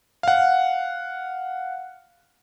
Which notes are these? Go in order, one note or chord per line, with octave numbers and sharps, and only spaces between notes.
F5 F#5